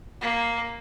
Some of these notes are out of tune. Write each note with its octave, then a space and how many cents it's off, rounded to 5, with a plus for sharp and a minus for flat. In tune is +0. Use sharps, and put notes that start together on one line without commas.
A#3 +0